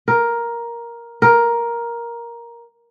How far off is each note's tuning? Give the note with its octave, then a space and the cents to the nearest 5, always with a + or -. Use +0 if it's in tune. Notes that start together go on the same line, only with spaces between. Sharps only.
A#4 +10
A#4 +10